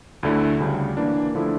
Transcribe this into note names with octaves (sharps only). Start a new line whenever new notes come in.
D2 D3 A3 E4
D2 C#3 G3
E3 A#3 D4
D3 F3 A3 E4 A4